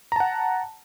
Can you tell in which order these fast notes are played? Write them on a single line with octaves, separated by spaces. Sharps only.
A#5 A5 F#5